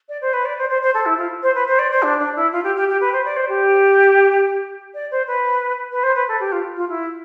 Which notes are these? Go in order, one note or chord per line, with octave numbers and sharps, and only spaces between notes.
D5
C5
B4
D5
C5
C5
C5
A4
E4
F4
C5
B4
C5
D5
C5
D4
D4
E4
F4
G4
G4
G4
B4
C5
D5
C5
G4
D5
C5
B4
B4
C5
B4
A4
G4
F4
F4
E4